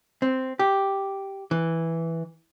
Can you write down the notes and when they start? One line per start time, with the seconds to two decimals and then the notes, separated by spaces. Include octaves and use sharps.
0.22 C4
0.59 G4
1.51 E3